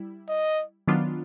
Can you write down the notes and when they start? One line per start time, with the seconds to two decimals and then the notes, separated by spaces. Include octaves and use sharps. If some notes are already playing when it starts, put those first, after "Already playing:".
Already playing: G3 E4
0.28 D#5
0.88 D#3 F#3 B3 D4 F4